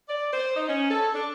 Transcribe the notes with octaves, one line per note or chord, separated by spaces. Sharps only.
D5
C5
D#4
C#4
A4
D4